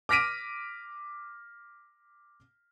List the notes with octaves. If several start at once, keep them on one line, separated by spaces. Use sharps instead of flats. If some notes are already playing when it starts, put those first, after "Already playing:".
D6 F6 A#6 B6 D7 D#7